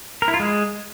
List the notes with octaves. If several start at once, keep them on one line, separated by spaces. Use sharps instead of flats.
A#4
E4
F4
G#3